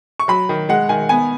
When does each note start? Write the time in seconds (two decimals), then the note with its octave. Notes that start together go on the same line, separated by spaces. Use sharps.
0.20 C#6
0.28 F#3 B5
0.49 D#3
0.69 G#3 F#5
0.89 D#3 G#5
1.09 B3 G#5